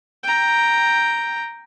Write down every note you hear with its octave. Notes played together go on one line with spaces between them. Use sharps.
G5 A#5